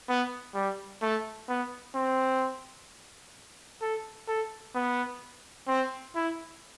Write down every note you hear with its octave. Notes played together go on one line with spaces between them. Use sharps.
B3
G3
A3
B3
C4
A4
A4
B3
C4
E4